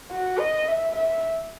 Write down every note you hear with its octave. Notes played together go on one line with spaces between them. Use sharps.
F#4
D#5
E5
E5